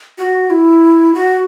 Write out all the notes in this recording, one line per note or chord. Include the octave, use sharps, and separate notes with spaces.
F#4
E4
F#4